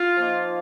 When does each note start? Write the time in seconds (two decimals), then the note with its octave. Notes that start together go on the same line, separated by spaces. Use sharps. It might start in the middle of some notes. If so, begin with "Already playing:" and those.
Already playing: F4
0.16 F3 A#3 D#4